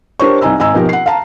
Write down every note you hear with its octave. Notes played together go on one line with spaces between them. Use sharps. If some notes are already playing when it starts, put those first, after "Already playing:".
D4 G4 A#4 C5 C#5 C#6
C2 D#4 D#5 G#5 A#5 E6
G#1 D#5 G#5 A#5 E6
B2 F3 D#4 G4 A#4
F#5 C7
F5 A5 A#5